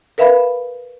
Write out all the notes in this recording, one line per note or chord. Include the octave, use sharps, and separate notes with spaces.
A#4 B4 E5 F5 B5